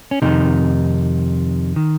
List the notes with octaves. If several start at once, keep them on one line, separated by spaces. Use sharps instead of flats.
C#4
F2 C3 D#3 D#4
D#3